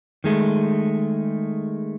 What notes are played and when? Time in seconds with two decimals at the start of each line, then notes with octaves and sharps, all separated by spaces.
0.24 D#3 G#3 A3